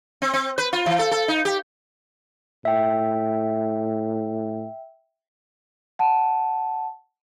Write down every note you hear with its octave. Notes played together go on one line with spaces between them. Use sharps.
C4
C4
B4
F4
E3
A4
A4
D#4
G4
A2 E5 G5
F#5 A5